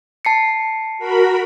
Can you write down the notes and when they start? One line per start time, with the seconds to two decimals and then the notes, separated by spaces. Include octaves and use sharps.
0.25 A5 C7 C#7
0.98 F#4 A#4 B5